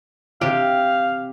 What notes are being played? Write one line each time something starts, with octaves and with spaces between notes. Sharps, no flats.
C3 G4 F5